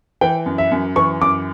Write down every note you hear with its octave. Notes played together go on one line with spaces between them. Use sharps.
E3 G5
F#2
E5
F#2
E3 C#6
F#2 D6